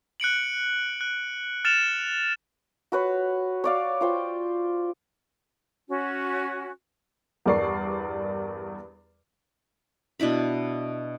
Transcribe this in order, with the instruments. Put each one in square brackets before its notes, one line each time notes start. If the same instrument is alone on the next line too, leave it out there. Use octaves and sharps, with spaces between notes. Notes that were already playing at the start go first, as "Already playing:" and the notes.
[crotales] F#6 C#7 D7 F#7
F#6
F6 A6 C#7 E7 F7
[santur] F#4 B4 C#5
C#5 D5 F5
F4 C5 G5
[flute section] C#4 F#4
[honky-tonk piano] E2 G2 A#4 D5 C#6 C7
[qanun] B2 D4 E4 B5